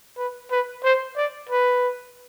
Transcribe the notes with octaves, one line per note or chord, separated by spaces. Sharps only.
B4
B4
C5
D5
B4